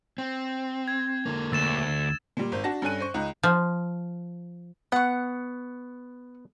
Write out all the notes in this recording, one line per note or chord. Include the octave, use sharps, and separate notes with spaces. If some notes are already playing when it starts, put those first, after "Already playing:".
C4
G#6
D3 A#3
D2 E6 A6 E7
A#2 G3
G#1 C5
D4 F#4 A5 A#6
G2 C#4 A4 G#5 F#6 D#7
C5 C#6
C#2 D#4 A#5 F#6
F3
B3 F#5 C#6